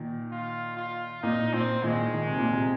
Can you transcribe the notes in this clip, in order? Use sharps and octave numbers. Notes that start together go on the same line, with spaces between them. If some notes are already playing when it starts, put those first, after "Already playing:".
Already playing: A#2 D#3
F4
F4
A#2 D#4
A#2 C4
A#2 D#3 G#3
D#3
C3
A#2
C3